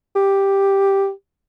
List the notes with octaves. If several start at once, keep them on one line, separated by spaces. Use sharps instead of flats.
G4